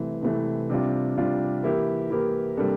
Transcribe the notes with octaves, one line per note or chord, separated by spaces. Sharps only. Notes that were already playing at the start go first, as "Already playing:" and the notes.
Already playing: C2 C3 E3 A3 C4
C2 C3 E3 A3 C4
C3 G3 D4 F4
C3 G3 D4 F4
E3 A#3 E4 G4 A#4
E3 A#3 E4 G4 A#4
C3 G3 A#3 D4 A4